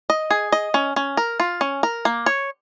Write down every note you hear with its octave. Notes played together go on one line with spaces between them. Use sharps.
D#5
G#4
D#5
C#4
C#4
A#4
F4
C#4
A#4
A#3
C#5